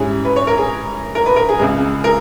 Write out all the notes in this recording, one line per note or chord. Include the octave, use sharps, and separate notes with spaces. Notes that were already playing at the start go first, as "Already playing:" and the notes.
Already playing: G#2 G3 C#4 E4 G#4
B4
C#5
A#4
G#4
A#4
B4
A#4
G#4
C#2 C#3 G#3
A#4